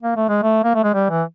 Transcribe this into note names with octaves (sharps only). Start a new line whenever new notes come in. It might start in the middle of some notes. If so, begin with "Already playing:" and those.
A#3
A3
G#3
A3
A#3
A3
G#3
G3
E3